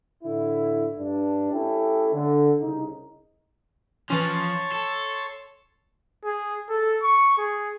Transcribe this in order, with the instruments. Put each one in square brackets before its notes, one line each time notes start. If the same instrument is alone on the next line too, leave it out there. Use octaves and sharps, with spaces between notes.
[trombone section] A2 D3 E4
G2 D4
A3 C#4 E4 G4 A4
D3
C2 C#3 D#4
[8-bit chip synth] E3 C#4 [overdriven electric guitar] F3 [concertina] C#5 A5 C6
[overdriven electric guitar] A4
[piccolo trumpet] G#4
A4
C#6
G#4